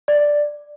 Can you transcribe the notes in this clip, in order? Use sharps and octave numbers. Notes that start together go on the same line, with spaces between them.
D5